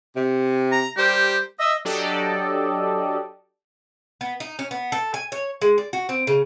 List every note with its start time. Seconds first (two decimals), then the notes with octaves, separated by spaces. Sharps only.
0.17 C3
0.72 A#5
0.97 G3 G4 A#4 C5
1.60 D#5 E5
1.85 F#3 D4 G4 A4 D5 D#5
4.21 B3
4.40 D#4
4.59 C#4
4.71 B3
4.92 A4
5.14 G#5
5.32 C#5
5.62 G#3
5.78 D5
5.93 F#4
6.09 C4
6.27 C#3